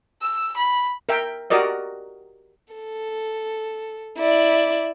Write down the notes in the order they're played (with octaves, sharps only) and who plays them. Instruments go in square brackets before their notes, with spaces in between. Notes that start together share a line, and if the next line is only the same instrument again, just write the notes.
[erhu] E6
B5
[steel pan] A#4 E5 G5
F#4 G4 A#4 D5 D#5
[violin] A4
E4 D5